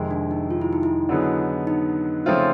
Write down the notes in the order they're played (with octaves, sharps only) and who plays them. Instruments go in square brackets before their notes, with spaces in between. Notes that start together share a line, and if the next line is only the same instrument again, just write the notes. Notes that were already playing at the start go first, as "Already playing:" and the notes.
Already playing: [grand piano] F2 C3 D#3 G#3
[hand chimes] D4
D#4
F4
E4
D#4
E4
[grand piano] D3 F#3 B3 D#4 G#4
[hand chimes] D#4
[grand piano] C#3 F3 A3 C4 F4